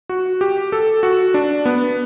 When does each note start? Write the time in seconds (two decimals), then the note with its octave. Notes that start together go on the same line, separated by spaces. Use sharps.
0.09 F#4
0.41 G4
0.72 A4
1.03 F#4
1.34 D4
1.66 B3